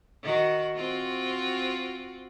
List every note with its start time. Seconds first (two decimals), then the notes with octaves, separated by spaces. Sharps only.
0.23 D#3 F#4
0.75 C4 F4 F#4